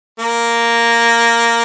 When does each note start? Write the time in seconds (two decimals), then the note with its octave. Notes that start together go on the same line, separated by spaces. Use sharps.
0.19 A#3